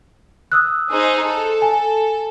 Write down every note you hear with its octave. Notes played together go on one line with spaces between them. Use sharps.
D#6 E6 F#6
D#4 G#4 C5
A4
G#5